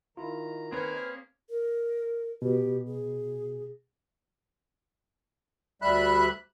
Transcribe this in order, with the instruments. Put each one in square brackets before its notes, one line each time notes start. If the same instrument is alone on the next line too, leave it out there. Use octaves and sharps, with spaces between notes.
[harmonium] D#3 A#5 [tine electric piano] E4 F4
[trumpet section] A#3 C#4 G#4 [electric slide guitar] C4 C#5 [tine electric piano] B4
[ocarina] A#4
[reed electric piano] B2 [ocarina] G4
[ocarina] G#4
[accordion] D2 G3 E5 B5 F#6